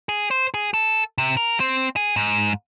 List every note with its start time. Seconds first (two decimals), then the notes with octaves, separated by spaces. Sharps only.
0.09 G#4
0.31 C5
0.54 G#4
0.74 A4
1.18 C3
1.37 A#4
1.60 C4
1.96 G#4
2.16 G#2